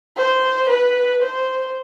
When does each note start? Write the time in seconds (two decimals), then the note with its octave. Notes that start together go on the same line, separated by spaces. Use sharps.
0.17 C5
0.69 B4
1.22 C5